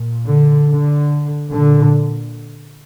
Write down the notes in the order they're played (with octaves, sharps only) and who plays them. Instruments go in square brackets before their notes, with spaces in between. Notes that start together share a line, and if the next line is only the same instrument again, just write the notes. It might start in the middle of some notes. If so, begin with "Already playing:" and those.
Already playing: [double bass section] A#2
D3
D3
A#2 D3